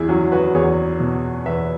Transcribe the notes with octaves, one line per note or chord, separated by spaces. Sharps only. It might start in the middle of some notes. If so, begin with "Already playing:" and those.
Already playing: E2 E4 G#4
F#3 C#4 F#4
F#4 B4
E2 G#4 C#5
B2
E2 B4 E5